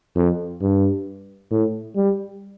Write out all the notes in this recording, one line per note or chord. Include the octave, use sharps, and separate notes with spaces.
F2
G2
A2
G3